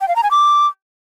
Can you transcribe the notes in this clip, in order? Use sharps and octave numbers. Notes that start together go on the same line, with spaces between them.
G5
F5
A#5
G#5
D6